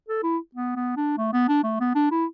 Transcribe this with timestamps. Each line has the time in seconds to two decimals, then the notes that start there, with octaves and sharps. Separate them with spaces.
0.08 A4
0.23 E4
0.55 B3
0.76 B3
0.97 D4
1.18 A3
1.33 B3
1.48 D4
1.64 A3
1.80 B3
1.95 D4
2.11 E4